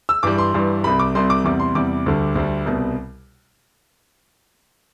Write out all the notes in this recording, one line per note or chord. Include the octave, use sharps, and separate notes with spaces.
E6
G2 E3 G3 D6
C6
G2 E3 G3
C2 C3 G3 B5
D6
C2 C3 G3 C6
D6
E2 C3 G3 D6
C6
E2 C3 G3 D6
D2 D3 G3
D2 D3 G3
C2 B2 G3